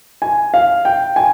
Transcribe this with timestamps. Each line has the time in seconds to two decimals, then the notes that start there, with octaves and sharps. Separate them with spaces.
0.22 G#5
0.54 F5
0.85 G5
1.16 G#5